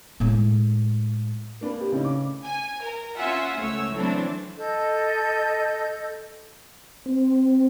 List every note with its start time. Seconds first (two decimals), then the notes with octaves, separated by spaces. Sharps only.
0.20 A2 G#3
1.61 A#3 D4 B4
1.81 G4
1.92 A2 C#3 D#4
2.05 D6
2.44 G#5
2.83 A#4
3.16 C#4 F4 E5 F#5 G#5
3.60 C#2 A3 C#5 E6
3.93 E3 F#3 A3 C4 D4
4.57 A4 D#5 G6
7.06 C4